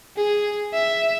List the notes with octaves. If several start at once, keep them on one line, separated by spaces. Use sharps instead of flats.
G#4
E5